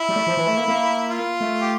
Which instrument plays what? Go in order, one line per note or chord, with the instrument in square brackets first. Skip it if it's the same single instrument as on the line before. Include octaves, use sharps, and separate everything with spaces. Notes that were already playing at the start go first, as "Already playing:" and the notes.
Already playing: [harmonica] E4
[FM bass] G3
A3
F3
E3
A3
A#3
A#3
[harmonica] F4
[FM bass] A3
[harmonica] G4